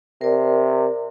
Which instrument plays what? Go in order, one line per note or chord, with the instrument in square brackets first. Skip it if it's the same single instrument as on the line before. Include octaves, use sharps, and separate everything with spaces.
[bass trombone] C3 [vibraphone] A#4 D5